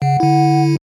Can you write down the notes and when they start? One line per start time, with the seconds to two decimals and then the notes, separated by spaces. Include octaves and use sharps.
0.02 C#3 F#5
0.20 D3 E4